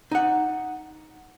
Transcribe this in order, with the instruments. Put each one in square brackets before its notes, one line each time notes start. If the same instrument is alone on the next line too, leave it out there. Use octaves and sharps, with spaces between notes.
[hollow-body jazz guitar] D#4 F#5